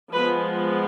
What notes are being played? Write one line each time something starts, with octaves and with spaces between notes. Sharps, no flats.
F3 G#3 B3 B4